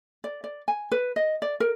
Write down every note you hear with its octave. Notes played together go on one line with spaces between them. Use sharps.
D5
D5
G#5
B4
D#5
D5
A#4